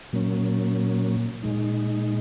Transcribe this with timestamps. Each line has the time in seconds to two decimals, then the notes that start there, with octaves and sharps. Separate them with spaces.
0.13 A#2 F#3 A#3 C#4
1.43 A#2 G#3 D#4